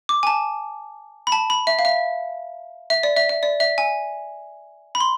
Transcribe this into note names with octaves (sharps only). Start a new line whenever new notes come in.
D6
G#5
A5
B5
A5
B5
E5
F5
E5
E5
D5
E5
E5
D5
E5
G#5
B5
C6